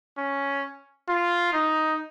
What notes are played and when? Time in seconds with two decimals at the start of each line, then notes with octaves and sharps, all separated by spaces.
0.18 C#4
1.09 F4
1.53 D#4